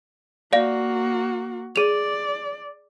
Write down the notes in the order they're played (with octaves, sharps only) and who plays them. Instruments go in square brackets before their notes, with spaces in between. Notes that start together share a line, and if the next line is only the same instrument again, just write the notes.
[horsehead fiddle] A#3 F#4 [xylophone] D5 F5
[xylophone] G#4 F7 [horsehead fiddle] D5